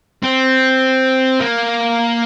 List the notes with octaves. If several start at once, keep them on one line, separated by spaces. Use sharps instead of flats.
C4
A#3